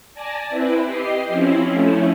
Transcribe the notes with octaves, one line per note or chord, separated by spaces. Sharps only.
D5 G#5 A5 A#6
C4 E4 B4
G4 D#5 C7
F3 C4 C#4 E4
F3 A3 C#4 E4